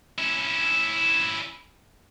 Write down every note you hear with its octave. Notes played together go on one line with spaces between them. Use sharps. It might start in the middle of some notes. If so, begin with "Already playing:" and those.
C#4 E4